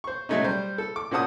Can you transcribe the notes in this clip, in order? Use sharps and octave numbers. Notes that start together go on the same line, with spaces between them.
C5 C#6
F#3 G#3 A3 C#4 D#4
G3 C5
A4
D6
A#2 C#4 C5 F#5 A5 D#6